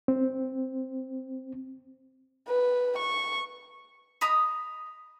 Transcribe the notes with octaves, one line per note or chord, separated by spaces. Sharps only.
C4
B4
C#6
D#5 A#5 B5 D#6